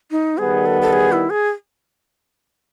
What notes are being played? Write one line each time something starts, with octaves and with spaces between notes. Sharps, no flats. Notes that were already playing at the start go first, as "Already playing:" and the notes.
D#4
D#3 G3 B3 G#4
A4
A4
G#4
E4
G#4